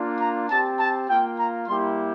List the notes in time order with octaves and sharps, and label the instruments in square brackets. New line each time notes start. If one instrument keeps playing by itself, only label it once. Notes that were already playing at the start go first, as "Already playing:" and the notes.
Already playing: [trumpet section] A#3 D4 F4
A#5
C4 G4 A5
A5
A#3 F4 G5
A#5
G3 A#3 E4 G4 C6